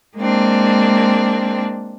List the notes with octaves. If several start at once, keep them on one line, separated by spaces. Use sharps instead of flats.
G#3 A#3 C4 D4